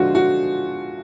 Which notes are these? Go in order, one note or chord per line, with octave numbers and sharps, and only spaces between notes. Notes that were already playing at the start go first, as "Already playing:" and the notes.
Already playing: D3 F3 G#3 F4 F#4
F#4